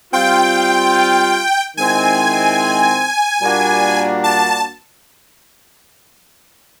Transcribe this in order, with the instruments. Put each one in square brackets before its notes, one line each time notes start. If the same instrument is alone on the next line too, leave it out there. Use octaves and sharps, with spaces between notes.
[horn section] G3 C4 F4 [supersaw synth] G5
[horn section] D#3 G#3 C4 E4 [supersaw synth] G#5
[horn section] A#2 G3 A#3 D4 F#4
[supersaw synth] A5